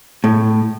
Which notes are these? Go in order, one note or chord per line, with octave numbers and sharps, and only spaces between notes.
A2